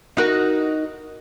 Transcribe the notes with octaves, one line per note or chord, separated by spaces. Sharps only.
D#4 F#4 A#4